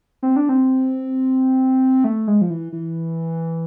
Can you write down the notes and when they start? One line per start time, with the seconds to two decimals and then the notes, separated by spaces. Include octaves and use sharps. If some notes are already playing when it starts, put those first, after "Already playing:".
0.23 C4
0.36 D4
0.49 C4
2.04 A3
2.28 G#3
2.42 F3
2.50 E3
2.72 E3